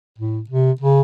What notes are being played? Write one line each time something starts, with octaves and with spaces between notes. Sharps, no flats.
A2
C3
C#3